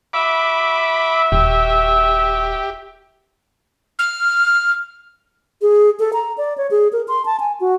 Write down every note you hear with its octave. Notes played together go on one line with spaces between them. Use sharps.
F#4 E5 B5 D6
D#1 G4
F6
G#4
A4
A#5
D5
C#5
G#4
A#4
C6
A5
G#5
F#4